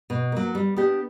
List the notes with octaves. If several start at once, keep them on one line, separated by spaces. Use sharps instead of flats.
B2
F#3 A#3
G3
B3 D4 G4